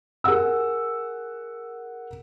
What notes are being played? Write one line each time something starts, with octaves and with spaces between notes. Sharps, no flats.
G#4 A#4 F#5 E6